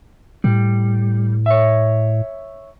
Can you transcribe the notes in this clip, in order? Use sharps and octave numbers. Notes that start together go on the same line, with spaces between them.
A2 G3
C#5 E5